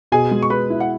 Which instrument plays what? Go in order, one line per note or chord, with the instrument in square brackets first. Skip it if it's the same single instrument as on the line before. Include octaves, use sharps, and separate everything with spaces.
[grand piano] B2 [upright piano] G#4 G#5
[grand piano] G#3
[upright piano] C#6
[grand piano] G#4 [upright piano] B4 B5
[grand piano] E4
[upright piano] F#5